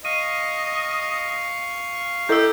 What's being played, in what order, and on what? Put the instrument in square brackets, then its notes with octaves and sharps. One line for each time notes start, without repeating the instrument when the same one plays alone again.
[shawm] D#5 [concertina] F5 C#6 [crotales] D#7
[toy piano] E4 A4 D#5 [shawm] G4 [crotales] E6 G6